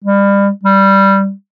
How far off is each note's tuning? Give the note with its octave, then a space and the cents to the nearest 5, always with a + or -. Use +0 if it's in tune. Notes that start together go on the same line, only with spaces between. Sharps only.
G3 +30
G3 -5